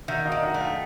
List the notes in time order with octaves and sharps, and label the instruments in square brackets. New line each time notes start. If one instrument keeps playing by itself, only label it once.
[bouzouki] D#3 [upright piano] E5 F#5
[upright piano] D#5 F5
[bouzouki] D#3
[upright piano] E5 F#5
[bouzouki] A3
[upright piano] F5 G5